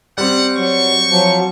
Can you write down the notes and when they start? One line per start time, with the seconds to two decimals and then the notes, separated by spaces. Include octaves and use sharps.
0.18 G3 C4 F#5
0.57 F#3 C#6
1.10 F3 F#3